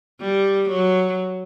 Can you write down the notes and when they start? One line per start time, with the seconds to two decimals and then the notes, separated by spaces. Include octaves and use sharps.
0.20 G3
0.69 F#3